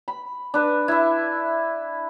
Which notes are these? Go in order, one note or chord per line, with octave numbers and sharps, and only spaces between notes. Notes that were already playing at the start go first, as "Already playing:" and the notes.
B5
D4 B4
E4 E5